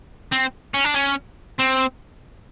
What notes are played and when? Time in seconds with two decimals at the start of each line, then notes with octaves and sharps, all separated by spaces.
0.32 C4
0.74 C#4
0.85 D4
0.95 C#4
1.59 C4